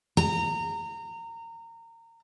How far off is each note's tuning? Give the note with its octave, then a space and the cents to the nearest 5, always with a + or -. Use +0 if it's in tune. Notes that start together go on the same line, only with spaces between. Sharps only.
A#5 -25